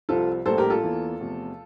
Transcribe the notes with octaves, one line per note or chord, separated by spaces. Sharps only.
C2 C3 F3 C4 F4 A4
A#1 A2 G3 A#3 A4 C5
G4 A#4
F4 A4
E2 E3 A#3
E2 C3 F3 A3